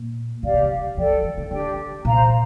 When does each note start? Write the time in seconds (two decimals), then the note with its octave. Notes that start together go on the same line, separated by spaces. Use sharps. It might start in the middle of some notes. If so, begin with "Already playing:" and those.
Already playing: A#2
0.43 D3 G4 D5 F5
0.54 C3
0.64 D3
0.97 F3 A4 D5 G5
1.10 F3
1.24 D#3
1.38 D3
1.51 D3 D4 G4 D5 G5
2.05 A#2 C5 F5 A#5